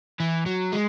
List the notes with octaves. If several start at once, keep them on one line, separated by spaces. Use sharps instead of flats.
E3
F#3
G#3